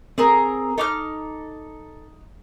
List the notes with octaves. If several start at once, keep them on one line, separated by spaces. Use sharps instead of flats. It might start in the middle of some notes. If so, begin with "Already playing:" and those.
C4 G#4 A#4
D#4 A4 D6 F6